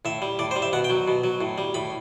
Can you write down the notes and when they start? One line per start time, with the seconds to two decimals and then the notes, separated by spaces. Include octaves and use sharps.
0.05 A2 E5
0.22 G3
0.39 A2 D5
0.51 C5
0.56 G3
0.62 E5
0.73 B2 F#5
0.84 G5
0.90 F#3
1.08 B2
1.24 F#3
1.41 A2
1.58 G3
1.74 A2 B5